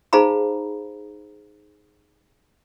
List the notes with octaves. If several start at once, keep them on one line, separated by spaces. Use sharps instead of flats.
D#4 G#4 C5 F5 A#5 B5